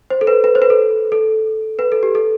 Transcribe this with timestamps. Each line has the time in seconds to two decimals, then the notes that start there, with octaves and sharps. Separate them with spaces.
0.10 C5
0.21 A4
0.27 B4
0.44 B4
0.55 C5
0.62 B4
0.70 A4
1.12 A4
1.79 B4
1.92 A4
2.03 G4
2.15 A4